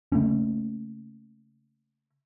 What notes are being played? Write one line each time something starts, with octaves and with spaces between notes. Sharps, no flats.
C#3 A3 A#3 C#4